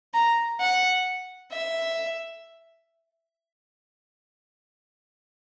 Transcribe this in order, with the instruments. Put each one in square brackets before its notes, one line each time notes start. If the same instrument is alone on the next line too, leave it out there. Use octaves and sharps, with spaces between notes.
[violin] A#5
F#5
E5